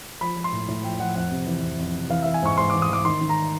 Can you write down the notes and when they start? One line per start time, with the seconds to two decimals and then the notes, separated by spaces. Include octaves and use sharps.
0.21 F3 B5
0.36 F3
0.44 C6
0.52 A2
0.68 A2
0.83 F3 G5
1.00 F3 F#5
1.16 F2 F#5
1.31 C3
1.47 E3
1.63 F2
1.79 F2
1.95 C3
2.10 E3 F5
2.22 E3 E5
2.34 G#5
2.43 G#2 C#6
2.57 G#2 C6
2.70 E3 D6
2.82 D#6
2.90 E3 D6
3.05 D#3 C6
3.21 D#3
3.29 A#5